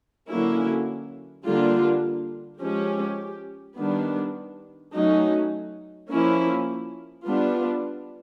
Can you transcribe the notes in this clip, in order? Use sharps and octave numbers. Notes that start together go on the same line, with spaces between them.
D3 F#3 A#3 C#4 E4
D3 G3 A#3 D4 F4
F3 G#3 C#4 G4
D#3 G3 B3 D4
F#3 A3 C#4 D#4
F3 A#3 C#4 E4
G3 B3 D4 F4